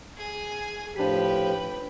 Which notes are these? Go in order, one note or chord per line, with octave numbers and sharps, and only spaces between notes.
G#4 G#5
A2 F3 D4 G4 B4 G5 B6